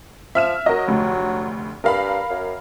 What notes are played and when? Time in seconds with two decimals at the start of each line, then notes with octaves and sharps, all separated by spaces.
0.35 F3 E5 F6 E7
0.66 F#3 A#4 D#5
0.87 F1 D2
1.84 G2 A#4 F5 B5
2.30 F#2